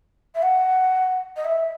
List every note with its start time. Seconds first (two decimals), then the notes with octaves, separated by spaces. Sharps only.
0.35 E5
0.43 F#5
1.37 D#5
1.45 E5